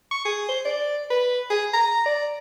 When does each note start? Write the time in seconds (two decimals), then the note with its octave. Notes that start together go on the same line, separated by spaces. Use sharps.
0.11 C#6
0.25 G#4
0.48 C5
0.65 D5
1.10 B4
1.50 G#4
1.73 A#5
2.06 D5